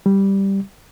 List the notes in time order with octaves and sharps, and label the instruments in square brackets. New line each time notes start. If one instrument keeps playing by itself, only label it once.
[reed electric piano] G3